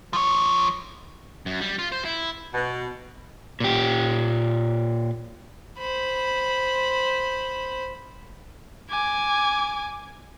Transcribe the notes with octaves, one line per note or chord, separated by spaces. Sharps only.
F3 C#5
F#2
G3
F4
C5
E4
B2
A#2 G4
C5 B5
G#5 D6